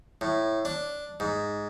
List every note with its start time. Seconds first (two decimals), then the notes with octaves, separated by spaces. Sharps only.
0.21 A2
0.65 D4
1.20 G#2